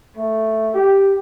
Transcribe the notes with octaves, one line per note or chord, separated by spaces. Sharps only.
A3
G4